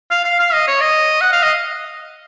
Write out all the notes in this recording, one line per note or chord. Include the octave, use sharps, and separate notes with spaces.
F5
F5
F5
D#5
C#5
D#5
F#5
F5
D#5